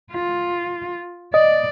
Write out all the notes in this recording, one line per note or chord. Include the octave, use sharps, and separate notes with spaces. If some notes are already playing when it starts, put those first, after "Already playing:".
F4
D5 D#5